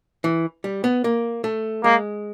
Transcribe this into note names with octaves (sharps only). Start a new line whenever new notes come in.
E3
G3
B3
A#3
A3
G#3 A#3